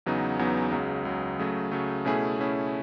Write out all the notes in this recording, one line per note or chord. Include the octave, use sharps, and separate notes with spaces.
E2 C#3 F#3 B3 D#4
E2 C#3 F#3 B3 D#4
C#2 C#3 F#3
C#2 C#3 F#3
C#3 F#3 A3
C#3 F#3 A3
B2 A3 C#4 E4 G#4
B2 A3 C#4 E4 G#4